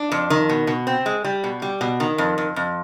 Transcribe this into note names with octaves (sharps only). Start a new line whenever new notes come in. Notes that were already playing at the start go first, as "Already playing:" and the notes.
Already playing: D4
F2
D#3
B2
B2
C4
G#3
G3
B2
G3
B2
D#3
F2
F2
F2